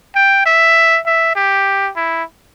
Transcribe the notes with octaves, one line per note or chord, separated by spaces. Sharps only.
G5
E5
E5
G4
E4